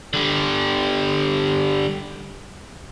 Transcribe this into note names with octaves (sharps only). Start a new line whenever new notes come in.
D3 G3